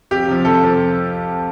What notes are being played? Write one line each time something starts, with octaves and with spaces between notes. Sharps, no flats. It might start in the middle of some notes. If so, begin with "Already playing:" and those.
F2 G4
C3 F3
F2 A4
C3 F3